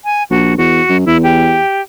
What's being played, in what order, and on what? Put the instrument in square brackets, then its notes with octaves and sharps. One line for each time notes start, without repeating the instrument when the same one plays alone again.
[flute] G#5
[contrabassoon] A#1 [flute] F#4
[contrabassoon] E2 [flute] F#4
[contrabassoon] F#2
[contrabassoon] E2 [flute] E4
[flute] G4